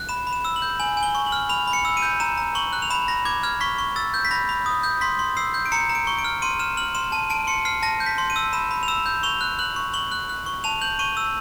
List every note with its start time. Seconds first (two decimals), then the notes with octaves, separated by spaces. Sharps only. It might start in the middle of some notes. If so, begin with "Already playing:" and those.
Already playing: F#6
0.09 B5 E7
0.27 B5
0.33 E7
0.45 E6
0.56 F#7
0.62 G6
0.80 G#5 F#7
0.97 G#5
1.03 G7
1.15 C#6
1.26 F#7
1.32 F6
1.49 B5 F7
1.67 B5
1.73 C#7
1.85 E6
1.97 D#7
2.02 G6
2.20 A#5 E7
2.38 A#5
2.55 C#6 F#7
2.73 F#6
2.82 F7
2.90 B5 E7
3.08 B5 A#6
3.25 D6 G#6
3.43 F6 G#6
3.61 C#6 B6
3.78 C#6
3.96 E6 A6
4.14 G6
4.25 B6
4.31 B5 A#6
4.49 B5
4.66 D#6
4.83 G6
5.01 C6 B6
5.19 C6
5.37 E6 C7
5.54 G6
5.66 D7
5.72 A#5 C#7
5.89 A#5
5.95 D7
6.07 C#6
6.18 D7
6.24 F6
6.42 C6 D#7
6.59 F6 E7
6.77 F6 F#7
6.95 C6 E7
7.12 A5 D#7
7.30 A5 D7
7.47 C6 C#7
7.65 F6 C7
7.83 A5 A#6
8.00 G6
8.06 B6
8.18 C6
8.30 D#7
8.36 E6
8.53 B5 E7
8.71 B5
8.83 F7
8.88 E6 E7
9.06 G6
9.23 C#6 F7
9.41 F#6
9.59 F#6 F#7
9.76 C#6
9.94 C#6 F#7
10.12 F#6
10.29 F#6
10.46 C#6
10.64 A5 F7
10.81 G6 F#7
10.99 C#6 D#7
11.17 E6